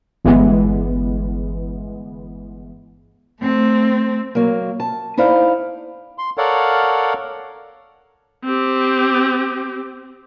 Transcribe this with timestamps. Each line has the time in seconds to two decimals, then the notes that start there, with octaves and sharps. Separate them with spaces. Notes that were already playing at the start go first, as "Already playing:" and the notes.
0.24 G1 E3 G#3 B3
3.41 A3 C4
4.35 F#3 A#3
4.80 A5
5.17 D#4 E4 C5 D5 F5
6.18 C6
6.38 A4 A#4 C#5 D5 F5 F#5
8.45 C4 G4